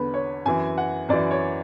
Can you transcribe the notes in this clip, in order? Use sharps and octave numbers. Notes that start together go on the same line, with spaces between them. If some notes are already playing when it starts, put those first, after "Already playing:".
Already playing: E2 D3 B4
C#5
F#2 E3 G#5
F#5
F#2 E3 D5
C#5